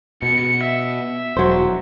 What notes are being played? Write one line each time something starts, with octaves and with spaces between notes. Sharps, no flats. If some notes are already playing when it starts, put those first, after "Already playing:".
B2 C#7
E5
E1 F#3 C5